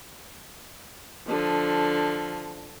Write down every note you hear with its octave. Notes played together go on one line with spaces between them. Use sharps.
D3 F3